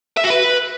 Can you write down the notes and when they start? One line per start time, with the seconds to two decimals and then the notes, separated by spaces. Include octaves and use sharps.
0.17 E5
0.24 F#4
0.30 B4